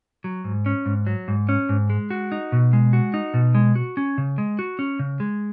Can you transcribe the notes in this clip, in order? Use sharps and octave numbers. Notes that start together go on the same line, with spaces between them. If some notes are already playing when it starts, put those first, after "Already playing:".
F#3
G#2
C#4
G#2
F#3
G#2
C#4
G#2
G#3
F#4
D#4
B2
G#3
F#4
D#4
B2
G#3
F#4
C#4
C#3
G#3
F#4
C#4
C#3
G#3